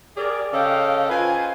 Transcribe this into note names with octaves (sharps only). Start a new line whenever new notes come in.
G4 G#4 A#4 D5
C#3 C#4 A4 D#5 F5 G5
F4 B4 C5 G#5